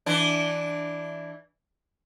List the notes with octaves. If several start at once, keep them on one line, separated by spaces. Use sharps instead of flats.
E3 D4